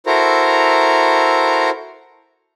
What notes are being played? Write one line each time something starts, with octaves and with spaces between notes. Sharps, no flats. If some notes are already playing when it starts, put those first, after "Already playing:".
E4 F#4 A4 A#4 C5 A#5